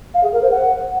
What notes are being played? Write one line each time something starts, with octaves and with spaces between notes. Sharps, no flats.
F5
G#4
A#4
C5
F#5